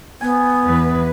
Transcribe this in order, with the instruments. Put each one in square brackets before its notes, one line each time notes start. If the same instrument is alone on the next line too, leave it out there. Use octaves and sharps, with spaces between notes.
[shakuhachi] B3 [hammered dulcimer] G#5
[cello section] E2 E3 B4